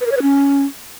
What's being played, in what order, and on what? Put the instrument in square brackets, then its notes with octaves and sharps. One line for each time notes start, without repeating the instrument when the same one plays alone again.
[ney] B4
A#4
C#5
B4
C#4